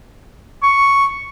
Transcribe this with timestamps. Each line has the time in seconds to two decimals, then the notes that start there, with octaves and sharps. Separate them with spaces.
0.63 C#6